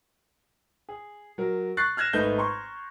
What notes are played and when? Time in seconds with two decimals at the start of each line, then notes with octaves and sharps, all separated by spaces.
0.89 G#4
1.38 F#3 A#4
1.77 C#6 F#6 A6 C7
1.97 F6 F#6 G#6 A#6 E7
2.13 G#1 A3 D#4 B4 G6 G7
2.38 A#5 C6 C#6